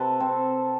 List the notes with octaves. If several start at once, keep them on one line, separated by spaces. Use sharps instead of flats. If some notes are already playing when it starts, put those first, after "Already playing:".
Already playing: C3 A4 B4
C4